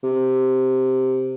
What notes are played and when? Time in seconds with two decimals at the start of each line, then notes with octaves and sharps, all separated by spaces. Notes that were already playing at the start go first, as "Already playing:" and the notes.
0.03 C3